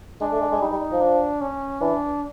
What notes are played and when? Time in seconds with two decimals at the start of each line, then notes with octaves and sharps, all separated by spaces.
0.21 G#3 D4
0.32 A3
0.41 G#3
0.52 G#3
0.61 G3 D#4
0.71 G3
0.92 F3
1.01 D4
1.41 C#4
1.81 E3 D4